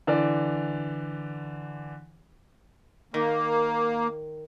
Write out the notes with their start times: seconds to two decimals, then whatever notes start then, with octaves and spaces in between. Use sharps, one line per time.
0.07 D3 E3 D5
3.14 D#3 A#3